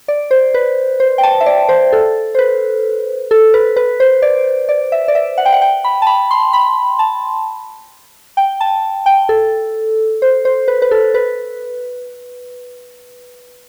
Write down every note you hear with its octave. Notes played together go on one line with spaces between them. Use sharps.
D5
C5
B4
C5
G5
A5
E5
D5
C5
A4
C5
B4
A4
B4
B4
C5
D5
D5
E5
D5
E5
F#5
G5
F#5
G5
B5
A5
B5
C6
B5
A5
G5
A5
G5
A4
C5
C5
B4
B4
A4
B4